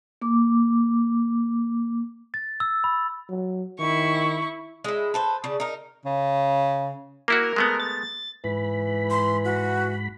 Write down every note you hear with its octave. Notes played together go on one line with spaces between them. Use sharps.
A#3 D6
A6
E6
B5
F#3
D#3 E4 C#6
G#3 E4
A4 B4 C5
C#3 D5
D#4 A#4
C#3
A#3 E4 F#4 A#4
G#3 A3 B3
A6
G#2 E3 B5
C6
F#4